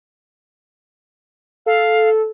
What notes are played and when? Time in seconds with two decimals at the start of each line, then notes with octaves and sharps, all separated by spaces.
1.66 A4 F5